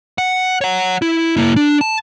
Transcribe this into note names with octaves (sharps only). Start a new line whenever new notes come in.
F#5
C#5 F#5
E4
A#3 E4
D4
A5